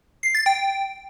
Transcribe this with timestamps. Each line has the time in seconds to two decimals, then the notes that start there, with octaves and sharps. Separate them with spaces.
0.23 C7
0.35 A6
0.46 G5